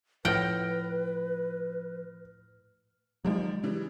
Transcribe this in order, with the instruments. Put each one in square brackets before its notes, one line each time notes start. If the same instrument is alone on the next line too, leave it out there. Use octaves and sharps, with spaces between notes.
[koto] A2 F#5 G5 [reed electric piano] F3 [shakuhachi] B4 [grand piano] F6 A#6
[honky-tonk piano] D#3 F3 G4 [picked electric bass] F#3 G#3
[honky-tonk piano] C#3 E3 G3